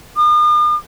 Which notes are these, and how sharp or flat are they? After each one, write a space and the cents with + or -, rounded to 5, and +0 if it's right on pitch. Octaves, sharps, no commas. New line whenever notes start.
D#6 -45